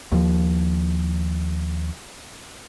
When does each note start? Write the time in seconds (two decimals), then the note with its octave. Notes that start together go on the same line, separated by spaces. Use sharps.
0.12 D#2 F3